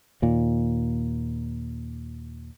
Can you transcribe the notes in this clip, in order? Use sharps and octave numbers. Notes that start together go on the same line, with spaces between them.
D#2 A#2